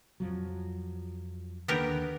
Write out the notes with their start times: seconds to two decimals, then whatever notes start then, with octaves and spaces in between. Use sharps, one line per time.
0.20 F2 F3 F#3
1.68 D#2 D3 B3 G4 A#4